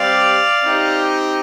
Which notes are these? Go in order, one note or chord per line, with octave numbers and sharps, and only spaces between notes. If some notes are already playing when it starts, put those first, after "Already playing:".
Already playing: G3 C4 G4 D5 F5
C4 D#4 G4